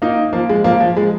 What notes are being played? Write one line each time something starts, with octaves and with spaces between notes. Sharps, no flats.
A#3 D#4
F3 A#3
G#3
F3 A#3
F3
G#3